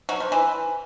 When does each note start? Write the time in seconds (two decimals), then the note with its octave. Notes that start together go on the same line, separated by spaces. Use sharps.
0.09 F#3
0.20 F3
0.32 E3